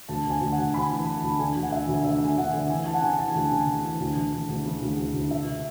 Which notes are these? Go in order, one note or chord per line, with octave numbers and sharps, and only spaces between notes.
D2 A5
D2 G#5
D2
F#5
D2
D2 B5
E3 A5
E3
A5
D2
D3 G#5
D2
F#5
D2 E5
D2
D3 E5
D3 G#5
D2 F#5
D3
E3 G#5
E3 A5
F#5
C#3 G#5
E3 A5
D2 A5
C#3
C#3
E3
D2
C#3
D2
D2
C#3
D2
D2
D2
C#2 E5